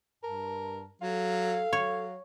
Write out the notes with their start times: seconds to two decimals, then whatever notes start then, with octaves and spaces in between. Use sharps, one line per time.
0.23 G2 A#4 A5
1.02 F#3 A4 F5
1.73 F#3 C#5